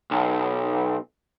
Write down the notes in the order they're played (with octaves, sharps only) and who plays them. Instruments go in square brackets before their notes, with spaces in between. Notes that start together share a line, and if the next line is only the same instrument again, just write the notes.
[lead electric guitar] B1